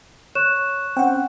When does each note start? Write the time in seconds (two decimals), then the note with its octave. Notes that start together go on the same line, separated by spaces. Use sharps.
0.35 C#5 C#6 F#6 E7
0.97 C4 C#4 F#5 G5